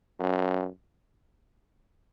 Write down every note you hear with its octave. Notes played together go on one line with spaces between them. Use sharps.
F#2